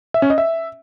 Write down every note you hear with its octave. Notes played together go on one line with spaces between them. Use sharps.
E5
C#4
D#5
E5